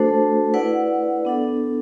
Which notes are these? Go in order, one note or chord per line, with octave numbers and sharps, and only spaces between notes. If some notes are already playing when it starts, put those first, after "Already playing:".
Already playing: A3 D4 F#4 A4 C5
E4 B4 D5 F#5
B3 D4 A4